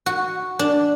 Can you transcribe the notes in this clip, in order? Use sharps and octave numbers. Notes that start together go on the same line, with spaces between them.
F#4
D4